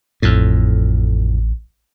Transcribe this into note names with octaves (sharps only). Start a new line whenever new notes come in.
A1 F2 A2